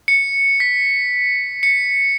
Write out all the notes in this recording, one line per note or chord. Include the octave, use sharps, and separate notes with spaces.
C#7
B6
C#7